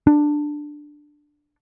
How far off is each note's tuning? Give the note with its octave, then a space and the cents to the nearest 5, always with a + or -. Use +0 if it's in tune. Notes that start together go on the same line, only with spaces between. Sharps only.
D4 +10